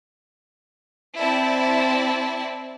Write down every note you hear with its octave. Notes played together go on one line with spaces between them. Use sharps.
C4 E4 D5 A5